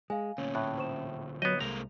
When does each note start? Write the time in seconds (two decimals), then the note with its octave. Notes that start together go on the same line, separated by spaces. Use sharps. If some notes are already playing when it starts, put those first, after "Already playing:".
0.10 G#3 F5 G#5
0.38 D2 A#2 C#4
0.55 A2 F#6
0.78 C5 C#6 E7
1.42 F#3 B3 D#5 G6
1.61 C2 G#3 A#3 A#5